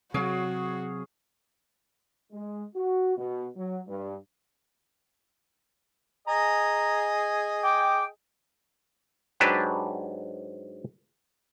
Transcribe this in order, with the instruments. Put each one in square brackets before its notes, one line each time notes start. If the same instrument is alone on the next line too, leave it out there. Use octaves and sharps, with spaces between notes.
[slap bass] C3 F#3 [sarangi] F#4 [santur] G#4 C#5 F5
[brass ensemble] G#3
F#4
B2
F#3
G2
[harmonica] G#4 D#5 G#5 [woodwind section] A#5
[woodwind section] G5 [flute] D6
[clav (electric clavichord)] G#2 F#3 D4 G4 B4 A5